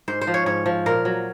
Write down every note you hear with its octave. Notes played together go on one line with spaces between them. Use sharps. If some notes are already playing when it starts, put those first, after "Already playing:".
G#2 C5
C5
F3
C#5
G#2 C#5
F3
A#2 A#4
F#3